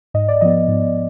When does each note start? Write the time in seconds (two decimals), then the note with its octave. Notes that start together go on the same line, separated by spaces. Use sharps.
0.14 G#2 D#5
0.28 D5
0.41 F3 B3 D#5
0.68 G#2